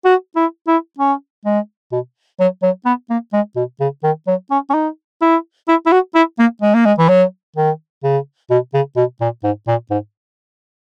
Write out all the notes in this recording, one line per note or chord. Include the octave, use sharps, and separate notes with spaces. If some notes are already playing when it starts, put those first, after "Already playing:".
F#4
E4
E4
C#4
G#3
B2
F#3
F#3
B3
A#3
G#3
B2
C#3
D#3
F#3
C#4
C#4
D#4
E4
E4
E4
F#4
E4
A#3
G#3
A#3
G#3
E3
F#3
D#3
C#3
B2
C#3
B2
A#2
G#2
A#2
G#2